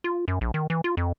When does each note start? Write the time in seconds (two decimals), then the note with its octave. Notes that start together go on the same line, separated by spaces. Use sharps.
0.04 F4
0.28 F#2
0.41 A#1
0.54 D#3
0.70 E3
0.84 F4
0.97 F2